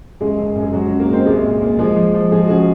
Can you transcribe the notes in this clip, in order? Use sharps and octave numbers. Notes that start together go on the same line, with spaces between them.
F#1 G#3 G#4
F#1
F#2
G#4
F#3 G#3 F#4
C#3 F#3 F#4
A#3 A#4
G#3 C4 C5
C2 G#3 G#4
A#2
A#3
F3 G#3 G#4
F3
F3
F3 G#3 G#4
F#4
C#3 G#3 G#4